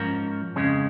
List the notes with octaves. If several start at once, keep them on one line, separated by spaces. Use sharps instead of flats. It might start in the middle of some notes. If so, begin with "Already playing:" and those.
Already playing: G#2 F3 C#4 A#4
F2 C#3 G#3 C#4